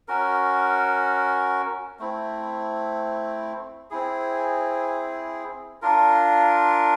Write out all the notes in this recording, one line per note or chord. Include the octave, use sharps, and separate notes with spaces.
C#4 F#4 A#4
A3 C4 E4
C4 E4 G#4
D4 F4 A#4